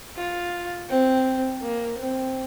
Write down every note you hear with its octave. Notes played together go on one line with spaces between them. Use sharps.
F4
C4
A#3
C4